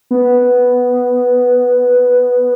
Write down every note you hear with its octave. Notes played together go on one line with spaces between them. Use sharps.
B3